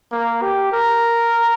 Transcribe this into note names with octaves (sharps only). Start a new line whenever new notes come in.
A#3
G4
A#4